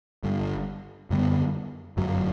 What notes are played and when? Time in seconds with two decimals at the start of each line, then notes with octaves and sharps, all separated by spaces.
0.23 G1 G2 D3
1.10 F#2 D3 G3 B3
1.97 G1 F#2 F#3